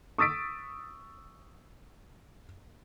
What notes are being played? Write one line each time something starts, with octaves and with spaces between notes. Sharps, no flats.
C#6 D#6 E6 A6 B6 D7